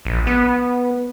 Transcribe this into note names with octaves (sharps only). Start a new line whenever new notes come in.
A#1
B3